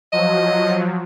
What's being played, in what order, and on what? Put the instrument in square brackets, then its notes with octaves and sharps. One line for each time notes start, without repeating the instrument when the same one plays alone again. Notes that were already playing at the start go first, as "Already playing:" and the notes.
[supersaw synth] F3 F#3 [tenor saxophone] D#5